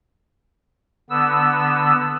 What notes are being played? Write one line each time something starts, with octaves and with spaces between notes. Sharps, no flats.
D3 B3 E6